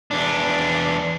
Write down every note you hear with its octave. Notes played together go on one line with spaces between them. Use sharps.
E2 D4